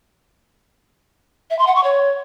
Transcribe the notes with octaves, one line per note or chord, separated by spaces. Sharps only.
E5
C6
F#5
C#6
C#5